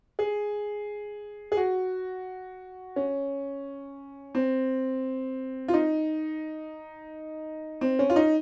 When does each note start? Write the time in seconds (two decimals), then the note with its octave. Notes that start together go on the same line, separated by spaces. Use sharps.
0.19 G#4
1.52 G#4
1.57 F#4
2.96 C#4
4.35 C4
5.68 F4
5.74 D#4
7.81 C4
7.99 C#4
8.10 F4
8.16 D#4